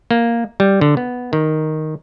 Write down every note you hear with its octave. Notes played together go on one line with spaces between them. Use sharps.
A#3
G3
D3
B3
D#3